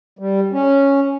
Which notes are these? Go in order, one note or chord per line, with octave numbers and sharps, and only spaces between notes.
G3
C#4